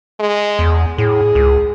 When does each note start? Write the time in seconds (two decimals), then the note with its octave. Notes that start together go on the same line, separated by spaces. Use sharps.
0.20 G#3
0.59 E2
0.98 A2 G#4
1.35 C#2